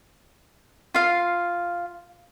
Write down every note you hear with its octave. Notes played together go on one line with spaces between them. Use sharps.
F4 F5